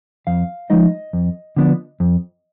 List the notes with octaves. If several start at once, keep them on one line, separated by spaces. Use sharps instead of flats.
F2 F5
F3 G#3 D#4 D#5
F2
D3 F3 B3 D4
F2